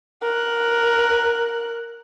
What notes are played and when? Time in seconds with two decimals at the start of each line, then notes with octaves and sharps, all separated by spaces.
0.22 A#4 F#6